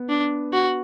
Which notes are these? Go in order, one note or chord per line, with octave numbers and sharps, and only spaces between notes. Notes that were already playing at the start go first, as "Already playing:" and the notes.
Already playing: B3
D4
F#4